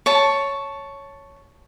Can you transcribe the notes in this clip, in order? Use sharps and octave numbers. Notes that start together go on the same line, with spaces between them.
C#5 A5